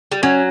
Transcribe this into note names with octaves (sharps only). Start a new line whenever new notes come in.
G3
F#3 C#4